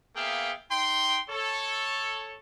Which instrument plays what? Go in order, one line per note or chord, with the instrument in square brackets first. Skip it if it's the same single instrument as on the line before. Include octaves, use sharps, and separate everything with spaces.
[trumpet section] A#3 B3 G#4 E5 F5 G5
D#4 G5 C6
A4 C#5